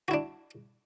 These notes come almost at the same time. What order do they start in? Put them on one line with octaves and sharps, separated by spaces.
F#4 E4 D4